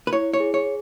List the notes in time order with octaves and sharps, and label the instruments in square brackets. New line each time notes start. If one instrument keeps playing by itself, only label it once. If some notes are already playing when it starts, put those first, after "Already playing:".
[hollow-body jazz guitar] B4
[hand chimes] E4 [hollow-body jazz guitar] C#5
[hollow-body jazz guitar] C#5
[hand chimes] G#4
[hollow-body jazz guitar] C#5